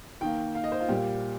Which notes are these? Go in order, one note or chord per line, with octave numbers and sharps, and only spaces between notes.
D#3 A#3 G5
F5
D#5
C5
F4
A#2 G3 A#3 G4